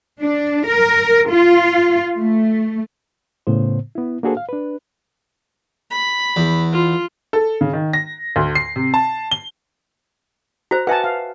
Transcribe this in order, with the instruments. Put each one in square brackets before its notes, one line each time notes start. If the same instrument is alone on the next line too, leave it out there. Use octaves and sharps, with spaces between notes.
[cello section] D4
A#4
F4
A3
[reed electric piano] A2 C#3 B3 C5
B3 E4
A#3 D4 F#4 G#4 A4 C5
F5
D4 B4
[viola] B5
[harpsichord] E2
[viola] F4
[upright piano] A4
C#3
D#3
A#6
D2
C7
C3
A5
G7
[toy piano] F#4 C5 [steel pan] A#5
[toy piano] B4 E5 [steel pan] F#5 G#5 A5
[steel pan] F5